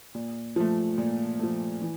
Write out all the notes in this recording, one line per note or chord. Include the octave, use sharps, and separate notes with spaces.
A#2
F3 A3
A#2
F3 A3
E3